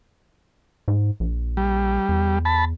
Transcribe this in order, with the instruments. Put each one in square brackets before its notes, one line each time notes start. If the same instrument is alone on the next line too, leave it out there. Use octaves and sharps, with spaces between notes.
[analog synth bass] G#2
A#1
[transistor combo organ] G3
[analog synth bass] E2
[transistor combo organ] A5 B5